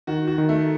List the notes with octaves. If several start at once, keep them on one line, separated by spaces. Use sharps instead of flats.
D#3 F#4
F#4
D#3
A3